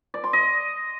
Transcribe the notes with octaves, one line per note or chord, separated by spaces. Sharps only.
D5
C6
D#5